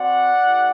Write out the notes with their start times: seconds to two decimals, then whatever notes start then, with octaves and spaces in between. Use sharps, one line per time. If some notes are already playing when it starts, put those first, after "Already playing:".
Already playing: C4 F#4 D5 F#5
0.41 A3 E4 G4